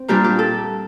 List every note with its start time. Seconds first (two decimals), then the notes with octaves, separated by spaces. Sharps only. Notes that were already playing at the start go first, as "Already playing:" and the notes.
Already playing: C4
0.08 A#2 G3 A#3 D4 G4
0.24 G4
0.39 A4